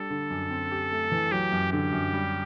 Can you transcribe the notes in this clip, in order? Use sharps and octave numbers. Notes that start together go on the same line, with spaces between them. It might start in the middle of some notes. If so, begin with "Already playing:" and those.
Already playing: G3 D4 A4
D3
F#2
C4
G4
A3
E3
F#3 G4
F#2
D3 G4
F#2
G3